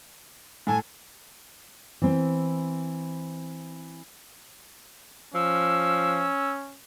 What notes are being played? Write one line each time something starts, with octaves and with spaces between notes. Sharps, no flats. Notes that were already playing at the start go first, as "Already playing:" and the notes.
A2 A4 G#5 A5
E3 C4
F3 C#4 E6